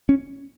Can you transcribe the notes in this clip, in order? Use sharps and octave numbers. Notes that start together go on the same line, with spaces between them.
C#4